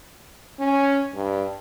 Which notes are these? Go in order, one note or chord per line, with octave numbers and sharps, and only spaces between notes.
C#4
G2